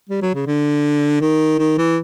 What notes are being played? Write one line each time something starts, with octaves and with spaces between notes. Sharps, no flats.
G3
F#3
C#3
D3
D#3
D#3
E3